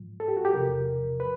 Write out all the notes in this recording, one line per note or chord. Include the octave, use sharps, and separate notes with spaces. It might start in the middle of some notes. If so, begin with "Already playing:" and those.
Already playing: G#2 F3
A4
G4
F#4
G4
E2 C3 F3 A#4
B4